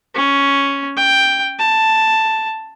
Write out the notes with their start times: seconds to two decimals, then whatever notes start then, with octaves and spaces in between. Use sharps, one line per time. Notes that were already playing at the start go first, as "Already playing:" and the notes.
0.15 C#4
0.97 G5
1.59 A5